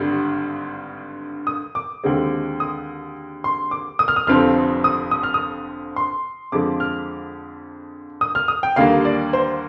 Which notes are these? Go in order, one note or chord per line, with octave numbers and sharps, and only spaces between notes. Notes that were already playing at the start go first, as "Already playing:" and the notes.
Already playing: G#1 G2 D3 G3
D#6
D6
D#2 D3 G#3 C4
D#6
C6
D6
D#6
F6
D#6
F1 F2 D3 F3 C4 F6
D#6
D#6
F6
D#6
C6
F2 D3 F3 G#3 D6
F6
D#6
F6
D#6
G5
D#2 D3 G3 A#3 F5
D5
C5